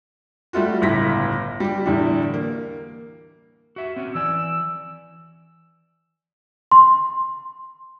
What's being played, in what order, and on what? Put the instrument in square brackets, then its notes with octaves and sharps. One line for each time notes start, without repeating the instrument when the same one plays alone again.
[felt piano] G3 A3 F4 F#4
G1 C#2 A2 A#6 B6
G3 G4
E2 A2 D3 G3
A#3
[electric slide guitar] F#4 E5
C4 C#4 F#4
[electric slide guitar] E3 D5 G#5 [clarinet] E6
[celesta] C6